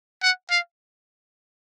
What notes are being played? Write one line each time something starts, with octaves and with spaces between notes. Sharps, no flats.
F#5
F5